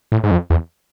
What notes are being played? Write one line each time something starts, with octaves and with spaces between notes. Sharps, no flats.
A2
G#2
F2
E2